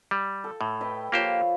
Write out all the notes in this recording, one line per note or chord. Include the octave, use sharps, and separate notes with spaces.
G3
A4
A2
B4 D#5 G5
F3 A#3 G4 C5 C#5